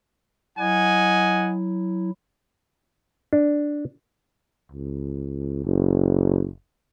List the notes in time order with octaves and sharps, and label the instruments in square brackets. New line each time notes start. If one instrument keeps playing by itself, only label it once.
[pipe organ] F#3 E4 [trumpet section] D#5 F#5 G#5
[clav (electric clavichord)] D4
[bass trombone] C#2
F#1